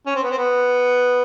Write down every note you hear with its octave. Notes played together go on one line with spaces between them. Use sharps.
C#4
C4
B3
C4
B3